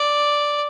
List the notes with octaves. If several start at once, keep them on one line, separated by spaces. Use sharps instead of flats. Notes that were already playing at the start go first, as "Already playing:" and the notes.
Already playing: D5